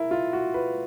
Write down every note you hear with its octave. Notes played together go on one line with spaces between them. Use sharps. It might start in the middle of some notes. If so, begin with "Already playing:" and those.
Already playing: E4 A#4
F4
F#4
B4